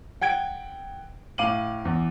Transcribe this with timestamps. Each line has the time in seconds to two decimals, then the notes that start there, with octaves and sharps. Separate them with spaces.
0.22 F#5 G5 G#6 D7
1.38 A2 F5 D6 D#7 F#7
1.85 E2